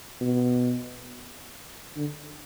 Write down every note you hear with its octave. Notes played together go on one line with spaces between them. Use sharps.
B2
D3